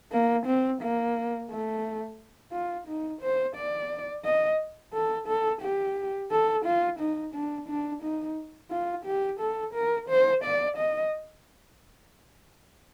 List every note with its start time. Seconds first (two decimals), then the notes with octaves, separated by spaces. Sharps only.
0.12 A#3
0.46 C4
0.81 A#3
1.50 A3
2.52 F4
2.87 D#4
3.22 C5
3.55 D5
4.25 D#5
4.93 A4
5.28 A4
5.61 G4
6.31 A4
6.65 F4
6.99 D#4
7.34 D4
7.68 D4
8.03 D#4
8.71 F4
9.05 G4
9.40 A4
9.74 A#4
10.09 C5
10.44 D5
10.77 D#5